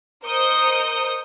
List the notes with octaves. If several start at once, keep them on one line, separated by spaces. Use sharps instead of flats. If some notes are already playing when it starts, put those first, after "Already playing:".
A#4 C5 D#5 D#6 G6 C#7